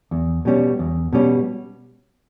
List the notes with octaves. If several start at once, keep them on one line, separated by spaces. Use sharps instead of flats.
E2
B2 G3 C#4
E2
B2 G3 C#4